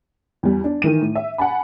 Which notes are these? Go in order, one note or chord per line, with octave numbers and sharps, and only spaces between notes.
E2 G3
D4
D#3 E3 D#7
A2
E5
F#5 G#5 A5 B5